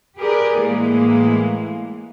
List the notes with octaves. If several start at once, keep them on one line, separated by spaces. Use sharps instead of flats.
G4 G#4 A#4 B4 D5
A2 E3 G#3 A#3